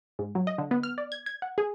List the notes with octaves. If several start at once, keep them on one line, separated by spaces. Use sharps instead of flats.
G#2
F#3
D#5
D3
B3
F6
D5
G#6
G#6
F#5
G#4